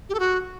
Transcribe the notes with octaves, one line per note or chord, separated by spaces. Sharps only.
G4
A4
F#4